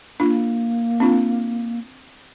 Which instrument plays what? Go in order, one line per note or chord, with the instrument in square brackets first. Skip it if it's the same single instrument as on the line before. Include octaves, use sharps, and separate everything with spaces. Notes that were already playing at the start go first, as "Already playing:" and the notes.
[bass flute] A#3 [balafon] D4 F4
[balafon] C4 D4 F4